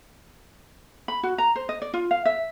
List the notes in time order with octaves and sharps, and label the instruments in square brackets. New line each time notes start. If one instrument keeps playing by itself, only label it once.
[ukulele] B5
F#4
A#5
C5
D#5
D5
F4
F5
E5